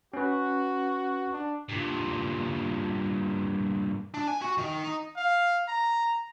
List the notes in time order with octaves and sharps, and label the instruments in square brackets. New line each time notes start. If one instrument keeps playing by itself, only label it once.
[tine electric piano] C#4 B4 [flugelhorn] F#4
[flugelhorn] D4
[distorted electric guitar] G2 A#2
[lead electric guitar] D4
G#5
F#4
D#3
D#4
[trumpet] F5
A#5